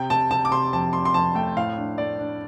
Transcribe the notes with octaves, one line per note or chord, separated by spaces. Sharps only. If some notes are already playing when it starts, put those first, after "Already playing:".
Already playing: C3 G5
C3 A5
C3 A5
D6
C3 C6
F2 A5
F2 C6
C6
F2 A5
A3 G5
A2 F5
D4
A3 D5
D4